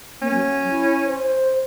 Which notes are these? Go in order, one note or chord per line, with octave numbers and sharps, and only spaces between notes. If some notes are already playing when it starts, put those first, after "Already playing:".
A#3 C#4
F#3
E4
C5